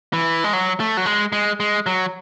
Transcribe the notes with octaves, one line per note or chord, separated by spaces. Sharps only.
E3
G#3
F#3
A3
F#3
G#3
G#3
G#3
F#3